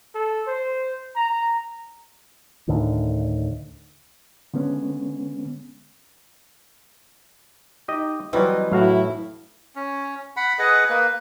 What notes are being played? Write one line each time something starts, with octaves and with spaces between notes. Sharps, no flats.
A4
C5
A#5
D2 A2 D3 D#3
D3 G#3 B3 C#4
D#4 G4 D#5
E3 F#3 G3 C4 D#5
A2 F#3 E4 F#4 F5
C#4
F#5 B5
G#4 B4 D#5 F#5
A#3 B4